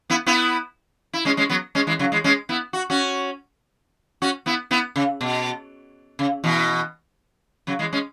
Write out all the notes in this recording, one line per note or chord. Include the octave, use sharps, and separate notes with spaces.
B3 E4
B3 E4
E4
G#3 C#4
G#3 C#4
F#3 B3
G#3 C#4
E3 G#3
C#3 F#3
E3 G#3
G#3 C#4
B3 E4
F#4
C#4 F#4
C#4 F#4
B3 E4
B3 E4
C#3
B2
C#3
B2 E3
C#3 F#3
E3 G#3
G#3 C#4